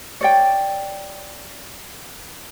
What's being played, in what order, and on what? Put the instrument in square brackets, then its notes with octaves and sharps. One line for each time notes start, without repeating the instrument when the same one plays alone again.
[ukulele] C#5 D5 G5